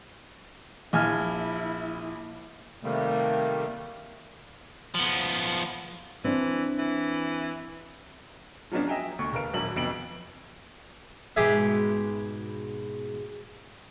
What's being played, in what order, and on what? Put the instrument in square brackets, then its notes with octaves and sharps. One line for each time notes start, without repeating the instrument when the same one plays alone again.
[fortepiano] A#1 G#5 F6 [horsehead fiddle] E4
[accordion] C3 D#3 G3 A3 A#3
[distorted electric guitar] F3 B3
[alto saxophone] E3 [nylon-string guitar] C4 D4
[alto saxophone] E3
[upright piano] F3 F#3 B3 C#4 D4
D#5 E5 G5 G#5 A#5
D2 C#6
E1 A#4 B4 F5 D7
D#1 A#1 F#3 A#3 F#7
F1 F2 B3 D7 F#7
[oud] G#2 B2 G#3 [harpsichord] G4 G#4 E5